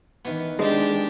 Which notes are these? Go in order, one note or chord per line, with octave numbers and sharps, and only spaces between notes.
D#3 E3 B3
G#3 D4 G4